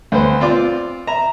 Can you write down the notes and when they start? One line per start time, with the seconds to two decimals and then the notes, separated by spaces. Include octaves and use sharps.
0.12 D2 B3 C5
0.40 C4 F4 D5 D6
1.07 E5 A#5